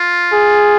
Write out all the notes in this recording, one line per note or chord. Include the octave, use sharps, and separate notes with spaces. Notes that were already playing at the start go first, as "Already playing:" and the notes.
Already playing: F4
G#4